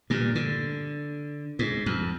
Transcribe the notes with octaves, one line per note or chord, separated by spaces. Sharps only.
G2 A#2
D3
G#2
F2